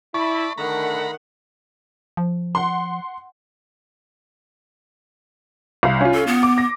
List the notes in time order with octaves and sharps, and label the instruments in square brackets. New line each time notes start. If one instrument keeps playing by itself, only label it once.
[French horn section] E4 [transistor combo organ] D5 A5 B5 [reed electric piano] C#6
[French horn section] D3 A3 [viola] D#3 F#5 [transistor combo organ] A#5 B5
[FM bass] F3
[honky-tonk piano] F#5 C6
C2 F5
C#4 F4
[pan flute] A4
B3
[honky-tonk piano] D6
A#6